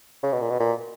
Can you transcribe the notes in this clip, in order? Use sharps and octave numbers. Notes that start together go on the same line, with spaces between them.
C#3
B2
A#2
B2
A#2